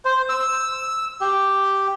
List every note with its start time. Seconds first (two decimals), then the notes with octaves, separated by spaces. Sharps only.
0.05 C5
0.29 E6
1.21 G4